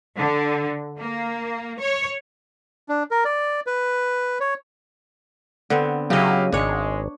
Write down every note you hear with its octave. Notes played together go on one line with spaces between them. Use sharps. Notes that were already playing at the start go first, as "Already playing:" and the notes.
D3
A#3
C#5
D4
A#4
D5
B4
C#5
D3 B3 C4
C#3 F#3 E4 G4 D#5 F5
G#1 G#3 D4 C#5